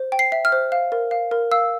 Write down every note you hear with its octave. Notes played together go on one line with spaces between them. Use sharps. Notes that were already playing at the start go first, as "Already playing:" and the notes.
Already playing: C5
G5
C7
E5
F6
C5
F5
A#4
F5
A#4
F5 E6